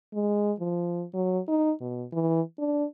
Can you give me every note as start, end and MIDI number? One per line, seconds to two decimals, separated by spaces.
0.14 0.52 56
0.60 1.04 53
1.14 1.39 54
1.48 1.72 63
1.80 2.05 47
2.12 2.41 52
2.59 2.85 62